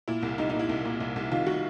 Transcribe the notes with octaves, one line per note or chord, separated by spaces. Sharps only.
A#2 E4
C2
C2 D#4
A#2 D#4
E4
C2
A#2
C2
C2
D#3 F4
D#3 F#4